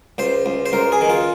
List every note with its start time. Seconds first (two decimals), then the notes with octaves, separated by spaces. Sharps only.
0.18 C#2 C5
0.46 C#2
0.66 C5
0.73 C#2 A#4
0.92 G#4
1.01 D#3
1.10 F4